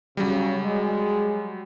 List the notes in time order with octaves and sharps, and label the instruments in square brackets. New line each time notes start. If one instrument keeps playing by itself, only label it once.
[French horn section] C#3 [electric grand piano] F#3 G3
[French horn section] G#3